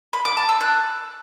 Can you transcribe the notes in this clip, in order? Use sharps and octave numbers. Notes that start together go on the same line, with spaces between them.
B5
D6
A5
E6
F#6